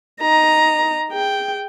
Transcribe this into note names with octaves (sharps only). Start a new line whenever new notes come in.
D#4 A#5
G#4 G5